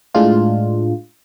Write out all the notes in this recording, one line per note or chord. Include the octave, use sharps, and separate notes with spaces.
A2 G#3 D4 F4